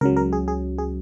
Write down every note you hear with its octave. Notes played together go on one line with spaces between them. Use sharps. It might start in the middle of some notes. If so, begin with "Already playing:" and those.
C#2 C#3 F#3 A#4
A#4
G#4
G#4
G#4